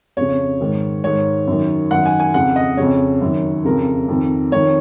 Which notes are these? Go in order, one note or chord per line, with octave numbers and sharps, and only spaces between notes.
F2 C#3 C#5
G#2 D#3
G#2 D#3 C#5
F#2 D#3
F#2 D#3 F#5
G#5
G#5
F2 C#3 F#5
D#5
F2 C#3 C#5
F#2 D#3
F2 C#3 A#4
F2 D#3
F2 D#3 C#5